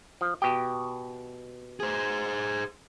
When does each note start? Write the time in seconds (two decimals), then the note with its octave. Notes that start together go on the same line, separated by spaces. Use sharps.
0.21 F3
0.42 B2 G4 G5
1.80 G#4 C5